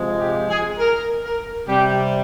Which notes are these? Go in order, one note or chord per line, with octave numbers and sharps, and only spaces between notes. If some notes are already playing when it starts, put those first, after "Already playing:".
Already playing: C3 F3 G#3
G4
G#4
A#4
A#4
C3 G3 G4